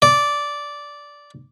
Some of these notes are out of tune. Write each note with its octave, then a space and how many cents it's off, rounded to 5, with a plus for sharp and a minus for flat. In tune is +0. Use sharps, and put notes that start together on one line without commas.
D5 -10